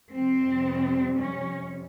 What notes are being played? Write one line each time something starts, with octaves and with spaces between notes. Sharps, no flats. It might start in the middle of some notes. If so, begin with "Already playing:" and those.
F2 C3 G3 C4
C#4